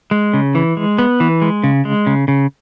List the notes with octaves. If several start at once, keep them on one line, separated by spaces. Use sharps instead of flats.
G#3
C#3
E3
G#3
B3
E3
G#3
C#3
G#3
C#3
C#3